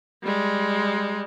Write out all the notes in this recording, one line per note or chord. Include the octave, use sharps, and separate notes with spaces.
G3 G#3